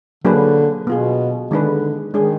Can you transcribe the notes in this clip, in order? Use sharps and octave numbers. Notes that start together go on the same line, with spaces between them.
D3 F#3 A#3 D4 G#4 B4
B2 B3 F4 G#4
D3 D#3 G#3 D4 G#4 B4
D#3 G#3 D4 G#4